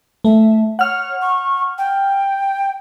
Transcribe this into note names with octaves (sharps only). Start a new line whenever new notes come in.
A3 E5
C#5 F#5 F6
C#6
G5